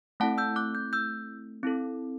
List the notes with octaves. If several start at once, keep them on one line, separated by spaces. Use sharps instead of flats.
A3 C4 E4 A4 F#5 A5
E6 G6
D6 F#6
G6
E6 G6
C4 E4 A4